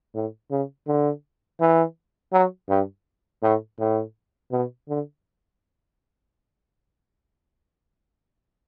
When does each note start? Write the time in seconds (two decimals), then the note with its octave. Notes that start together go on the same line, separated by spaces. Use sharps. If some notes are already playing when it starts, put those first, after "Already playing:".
0.15 A2
0.51 C#3
0.87 D3
1.60 E3
2.33 F#3
2.69 G2
3.43 A2
3.80 A2
4.52 B2
4.89 D3